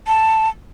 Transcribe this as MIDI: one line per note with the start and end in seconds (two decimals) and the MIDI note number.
0.07 0.49 81